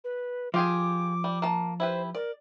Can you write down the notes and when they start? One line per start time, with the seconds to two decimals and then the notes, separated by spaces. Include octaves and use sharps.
0.04 B4
0.54 F3 F4 G4 G#4 D6
1.24 G3
1.42 A#3 A5
1.80 E4 G4 B4 C5
2.15 A#4 D5